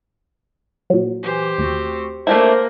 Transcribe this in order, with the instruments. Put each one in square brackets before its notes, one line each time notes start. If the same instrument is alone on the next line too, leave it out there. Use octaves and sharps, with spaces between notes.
[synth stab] A#2 F#3
[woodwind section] E3 [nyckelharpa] G4 C5
[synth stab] D#2 [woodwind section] A3 C4 F#4
[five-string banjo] A3 D4 E4 [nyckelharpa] A#3 A#4 [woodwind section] C5